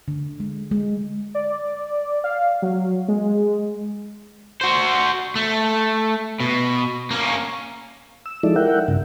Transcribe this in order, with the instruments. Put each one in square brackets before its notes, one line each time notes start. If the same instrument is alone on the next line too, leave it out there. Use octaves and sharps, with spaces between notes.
[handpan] D3
G#3
G#3
[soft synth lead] D5
F5
F#3
G#3
[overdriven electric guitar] F#4 C5
A3
B2
A#3 C#4
[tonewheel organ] E6
F3 G#3 D#4 E4 A4 D5
E4 A#4 E5 F#5 G5
G2 C#3